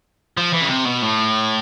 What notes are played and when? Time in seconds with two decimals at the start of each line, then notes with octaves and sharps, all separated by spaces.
0.38 F3
0.53 E3
0.62 C#3
0.69 C3
0.86 B2
1.02 A2